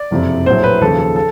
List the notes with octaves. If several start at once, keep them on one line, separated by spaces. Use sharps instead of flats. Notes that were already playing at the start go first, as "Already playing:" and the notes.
Already playing: D5
F#1 F2 C3
A#1 A2 F#3 C5
B4
D#2 C#3 F3 A4
A4
A4